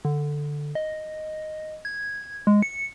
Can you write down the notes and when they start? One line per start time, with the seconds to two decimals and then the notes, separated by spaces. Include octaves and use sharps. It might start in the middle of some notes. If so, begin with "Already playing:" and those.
0.05 D3
0.75 D#5
1.85 G#6
2.47 G#3
2.62 C#7